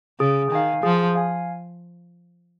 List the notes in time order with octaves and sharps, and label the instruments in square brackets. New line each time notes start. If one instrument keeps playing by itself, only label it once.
[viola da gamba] C#3 [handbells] G#4
[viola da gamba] D#3 [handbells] F5 G#5
[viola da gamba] F3 [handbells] G#4
[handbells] F5 G#5